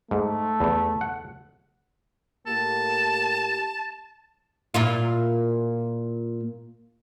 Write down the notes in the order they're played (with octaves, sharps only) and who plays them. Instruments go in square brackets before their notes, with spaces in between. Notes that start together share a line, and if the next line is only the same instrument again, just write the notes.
[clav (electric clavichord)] G#2 [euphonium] A3
[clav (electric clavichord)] E2
F#5
[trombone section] A2 A#3 G4 [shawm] A5
[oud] A#2 E4 F4